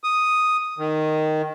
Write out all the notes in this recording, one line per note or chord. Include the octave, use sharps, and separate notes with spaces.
D#6
D#3